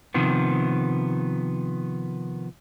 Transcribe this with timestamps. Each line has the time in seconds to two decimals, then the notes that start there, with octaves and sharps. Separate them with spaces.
0.14 C3 D#3 F3 B3